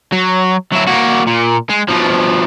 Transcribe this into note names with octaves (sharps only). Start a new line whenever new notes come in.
F#3
F#3 E4
A#3 F#4
A#2
G#3
B2 F3